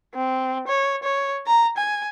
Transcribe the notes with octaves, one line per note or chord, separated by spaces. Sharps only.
C4
C#5
C#5
A#5
G#5